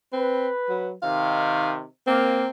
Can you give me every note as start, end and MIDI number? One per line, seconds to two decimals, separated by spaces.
0.13 0.49 60
0.13 0.90 71
0.70 0.93 54
1.02 1.83 48
1.02 1.83 51
1.02 1.71 77
2.07 2.43 58
2.07 2.49 60